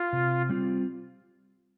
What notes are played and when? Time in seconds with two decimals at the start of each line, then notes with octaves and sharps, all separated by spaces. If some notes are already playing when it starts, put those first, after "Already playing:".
Already playing: F4
0.13 C3
0.49 G3 C4 F4